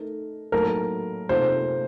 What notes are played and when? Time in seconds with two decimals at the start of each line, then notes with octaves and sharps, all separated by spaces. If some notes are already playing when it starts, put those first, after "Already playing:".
Already playing: A3 D#4 A#4
0.52 A2 F#3 A#3 D#4 A4 A#4
1.29 C3 F3 A#3 D#4 A4 C5